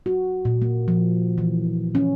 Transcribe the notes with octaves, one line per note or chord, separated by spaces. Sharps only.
F#4
A#2
A#3
F3
E3
C#4